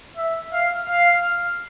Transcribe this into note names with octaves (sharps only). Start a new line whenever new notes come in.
E5
F5
F5